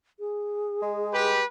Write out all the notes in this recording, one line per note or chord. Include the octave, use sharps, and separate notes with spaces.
G#4
G#3
G4 B4